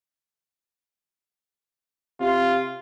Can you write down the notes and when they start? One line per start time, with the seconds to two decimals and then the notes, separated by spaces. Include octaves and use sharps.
2.20 C3 F4